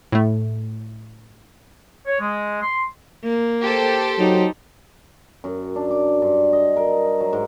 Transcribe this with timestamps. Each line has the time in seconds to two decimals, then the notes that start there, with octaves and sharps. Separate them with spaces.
0.12 A2 A3
2.06 C#5
2.20 G#3
2.62 C6
3.24 A#3
3.64 G4 A4 C5
4.19 F#3 D#4
5.44 F#2
5.76 D4
5.90 D6
6.22 G2
6.53 D#5
6.76 A#4
7.20 F#3
7.33 G#2